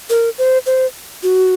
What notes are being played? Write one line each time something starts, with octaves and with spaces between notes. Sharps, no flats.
A#4
C5
C5
F#4